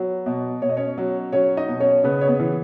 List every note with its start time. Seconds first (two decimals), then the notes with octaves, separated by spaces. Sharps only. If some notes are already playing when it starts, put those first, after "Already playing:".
Already playing: F#3 B3
0.26 B2
0.62 B2 C#5
0.69 D#5
0.77 C#4 C#5
0.98 F#3
1.33 F#3 C#4 C#5
1.57 D#4 D#5
1.69 B2
1.80 C#4 C#5
2.04 C#3 B3 B4
2.21 C#5
2.28 B3 B4
2.40 E3